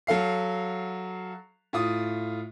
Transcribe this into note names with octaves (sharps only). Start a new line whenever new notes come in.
F#3 A4 F5 C7
A2 F4 D#6